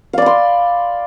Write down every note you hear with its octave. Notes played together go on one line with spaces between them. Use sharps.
D5 F5 B5 C6